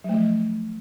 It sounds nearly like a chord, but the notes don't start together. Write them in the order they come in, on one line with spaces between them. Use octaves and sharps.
F#3 A3 F3